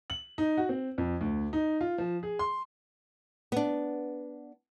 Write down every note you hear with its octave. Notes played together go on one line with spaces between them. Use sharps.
F#7
D#4
F#4
C4
F2
D2
D#4
F4
F3
G#4
C6
B3 D4